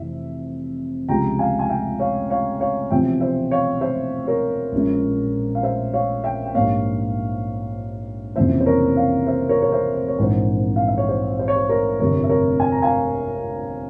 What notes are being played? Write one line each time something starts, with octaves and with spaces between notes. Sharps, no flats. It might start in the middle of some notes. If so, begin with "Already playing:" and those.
Already playing: F1 F2 E3 E5
C#2 C3 F3 G#3 G5 A#5
F5 G#5
G#5
E5 G5
C#5 F5
C#5 F5
C#5 F5
E1 E2 C3 F3 C4 E5 G5
C5 E5
C#5 F5
C5 E5
A#4 C#5
A#1 A#2 G#3 C#4
F5
C5 E5
C#5 F5
E5 G5
G5
A#1 G#2 G3 A#3 C#5 F5
F1 F2 C#3 E3 A#3 C5 E5
C5
A#4 C#5
C#5 F5
C5 E5
A#4 C#5
C#5
C5 E5
C5
C#5
A#1 G#2 E3 C5
F5
E5
C#5
C5
C5
C#5
C5
A#4 C#5
G1 F2 C3 A#4 C#5
E5
A#4 C#5
G#5
A#5
F5 G#5